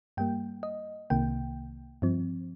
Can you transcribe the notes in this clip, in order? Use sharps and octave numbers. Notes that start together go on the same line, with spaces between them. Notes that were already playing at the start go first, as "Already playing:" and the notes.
G2 G3 A#3 G5
D#5
C2 C3 D#3 A#3 G5
G2 F3 C4